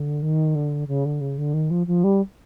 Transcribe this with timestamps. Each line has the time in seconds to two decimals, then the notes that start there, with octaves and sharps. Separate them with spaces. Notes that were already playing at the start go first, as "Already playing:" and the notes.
Already playing: D3
0.22 D#3
0.55 D3
0.87 C#3
1.05 D3
1.21 C#3
1.38 D3
1.53 D#3
1.70 F3
1.87 F3
2.04 G3